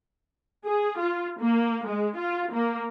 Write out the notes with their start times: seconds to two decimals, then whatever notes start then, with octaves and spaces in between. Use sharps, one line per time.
0.67 G#4
0.99 F4
1.40 A#3
1.88 G#3
2.17 F4
2.52 A#3